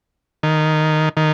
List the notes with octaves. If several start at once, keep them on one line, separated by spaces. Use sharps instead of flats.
D#3
D#3